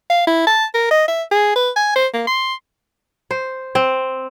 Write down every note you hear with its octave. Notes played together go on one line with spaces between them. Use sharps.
F5
E4
A5
A#4
D#5
E5
G#4
B4
G#5
C5
A#3
C6
C5
C4